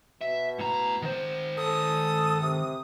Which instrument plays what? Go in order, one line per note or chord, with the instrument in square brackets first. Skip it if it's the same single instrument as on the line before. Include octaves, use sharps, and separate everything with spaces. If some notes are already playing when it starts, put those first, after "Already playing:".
[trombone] B2 [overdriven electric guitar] E5
[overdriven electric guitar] A2 A#5
D#3 C5
[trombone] A4 [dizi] D#6
[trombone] C3